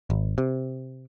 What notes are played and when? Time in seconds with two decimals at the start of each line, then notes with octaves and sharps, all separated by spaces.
0.10 G#1
0.38 C3